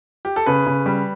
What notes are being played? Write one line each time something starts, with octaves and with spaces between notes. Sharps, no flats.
G4
A4
C#3 B4
C#3
G3